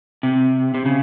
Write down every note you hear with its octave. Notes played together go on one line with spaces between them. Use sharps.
C3
C3
C#3